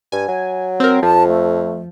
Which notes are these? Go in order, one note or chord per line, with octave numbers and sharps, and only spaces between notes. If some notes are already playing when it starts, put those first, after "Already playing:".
G2 G#5
F#3
C4 A#4
F2 F3 A5
A3